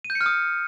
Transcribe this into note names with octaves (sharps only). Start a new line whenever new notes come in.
D#7
G6
C#7
F6
D#6